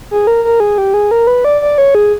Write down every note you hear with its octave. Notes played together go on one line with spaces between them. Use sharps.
G#4
A#4
A#4
G#4
G4
G#4
A#4
B4
D5
D5
C#5
G#4